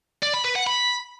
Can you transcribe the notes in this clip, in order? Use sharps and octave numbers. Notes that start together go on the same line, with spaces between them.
D5
B5
B4
F#5
B5